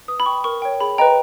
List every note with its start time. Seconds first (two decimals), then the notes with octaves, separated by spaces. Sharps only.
0.08 B4 D#6
0.20 B5
0.26 G5 C#6
0.44 A#4 C#6
0.62 C#5 G5
0.80 G#4 B5
0.98 B4 D#5 G5 A#5